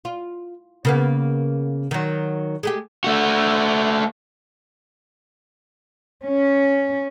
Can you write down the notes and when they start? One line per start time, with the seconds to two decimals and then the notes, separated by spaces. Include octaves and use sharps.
0.05 F4
0.85 C#3 A#3 B3
1.91 D#3 F#3
2.63 G#3 A3 G4
3.04 A3 F#4
6.26 C#4